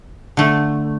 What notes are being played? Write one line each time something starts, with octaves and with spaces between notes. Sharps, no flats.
D3 A3